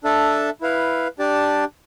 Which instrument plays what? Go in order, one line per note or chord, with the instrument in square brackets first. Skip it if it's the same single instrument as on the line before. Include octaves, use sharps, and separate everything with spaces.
[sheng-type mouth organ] D4 A4 E5 A5
E4 B4 F5
D4 G4 D5 A5